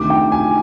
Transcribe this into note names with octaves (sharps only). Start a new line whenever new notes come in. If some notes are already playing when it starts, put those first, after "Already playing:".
Already playing: D2 C3 D#3 D6
G5
G#5